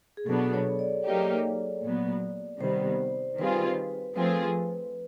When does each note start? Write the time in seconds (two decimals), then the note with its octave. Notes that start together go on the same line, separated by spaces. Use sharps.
0.17 G#4
0.26 B2 F#3 B3 D4 A4
0.53 C#5
0.79 D5
1.05 F#3 A#3 D#4 G4
1.83 A#2 F#3 B3
2.60 C3 D#3 G3 B3 C5
3.38 D#3 G3 C4 F4 G#4 B4
4.16 F3 A3 C4 F4 G#4 B4